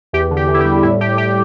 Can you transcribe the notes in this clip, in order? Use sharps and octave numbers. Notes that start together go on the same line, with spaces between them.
E2 G4
D3
G4
E2
E4
G4
G3
A2 E4
A2 G4
A2 G4